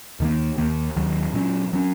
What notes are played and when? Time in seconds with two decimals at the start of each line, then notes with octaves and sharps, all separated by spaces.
0.20 D#2 D#3 A#3
0.58 D#2 D#3 A#3
0.96 D#2 D#3 F#3
1.33 A#2 F#3 C#4
1.73 F#3 A#3 C#4